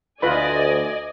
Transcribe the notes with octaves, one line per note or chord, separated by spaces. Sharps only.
D2 F4 B4 D5 D#5 G#5 B5